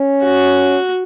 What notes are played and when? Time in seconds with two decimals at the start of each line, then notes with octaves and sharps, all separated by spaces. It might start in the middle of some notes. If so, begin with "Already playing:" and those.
Already playing: C#4
0.24 F#4